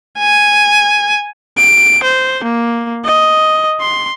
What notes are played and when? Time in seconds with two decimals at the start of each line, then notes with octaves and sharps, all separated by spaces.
0.19 G#5
1.57 D7
2.03 C5
2.44 A#3
3.05 D#5
3.80 C6